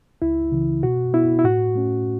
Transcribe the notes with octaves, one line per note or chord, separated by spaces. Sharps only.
C#2 E4
C#3 E3
B2 F#4
B3 E4
E4
A2 F#4
A3 C#4